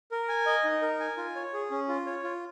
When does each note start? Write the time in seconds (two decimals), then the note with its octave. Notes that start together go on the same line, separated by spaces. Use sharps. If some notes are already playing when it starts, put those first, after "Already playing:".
0.11 A#4
0.29 G#5
0.46 D#5
0.64 D#4
0.82 A#4
1.00 G#5
1.17 F4
1.36 C#5
1.53 G#4
1.71 C#4
1.88 F4
2.06 C#5
2.24 F4